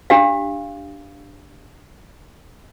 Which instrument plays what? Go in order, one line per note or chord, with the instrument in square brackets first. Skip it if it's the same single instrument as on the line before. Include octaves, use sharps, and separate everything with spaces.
[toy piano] D4 G4 F5